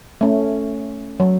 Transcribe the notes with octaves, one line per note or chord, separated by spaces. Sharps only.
A3 C#4
F#3